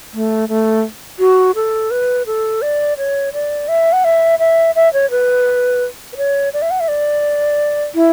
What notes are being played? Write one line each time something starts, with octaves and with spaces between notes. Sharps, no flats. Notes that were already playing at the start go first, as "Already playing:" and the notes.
A3
A3
F#4
A4
B4
A4
D5
C#5
D5
E5
F#5
E5
E5
E5
C#5
B4
B4
C#5
D5
E5
F#5
E5
D5
E4